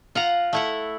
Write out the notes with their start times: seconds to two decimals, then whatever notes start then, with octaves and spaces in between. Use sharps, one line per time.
0.15 F4 F#5 A#5
0.53 A3 E4 F#5